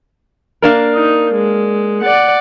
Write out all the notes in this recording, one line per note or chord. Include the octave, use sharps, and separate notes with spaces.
A#3 D4 A#4
D#4
G#3
D5 F#5